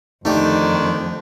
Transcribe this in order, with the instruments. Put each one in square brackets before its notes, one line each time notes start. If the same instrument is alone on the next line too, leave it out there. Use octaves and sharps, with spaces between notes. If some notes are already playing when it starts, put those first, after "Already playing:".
[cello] F2 [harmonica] D3 D#3 [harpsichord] A3 G4 [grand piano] D#4 D5 G5